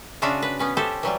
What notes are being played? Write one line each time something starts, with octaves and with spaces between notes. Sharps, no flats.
C#3 D4 F4 F#4 E5 F5
B4
B3 C#4 B4
C#4 G4 A4 C5 E5
E3 F#3 G3